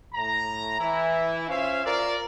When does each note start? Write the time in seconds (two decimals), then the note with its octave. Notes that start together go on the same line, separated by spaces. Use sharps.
0.14 A2 A#5
0.80 E3 E4
1.49 C#4 F4 C5 E5 F5
1.85 F4 A#4 D5